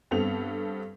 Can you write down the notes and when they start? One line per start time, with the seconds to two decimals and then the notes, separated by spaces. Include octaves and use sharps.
0.11 G2 B3 C4 A4 F7